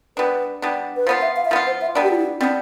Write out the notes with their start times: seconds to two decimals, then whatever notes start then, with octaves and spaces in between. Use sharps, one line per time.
0.17 G3 B3 D4 B4
0.62 G3 B3 D4
0.96 B4
1.07 F3 B3 F4 C5
1.22 E5
1.36 F5
1.45 E5
1.51 F3 B3 F4 F5
1.67 C5
1.81 E5
1.95 G3 B3 D4 D5
2.03 G4
2.11 F4
2.18 E4
2.41 G3 B3 C4 D4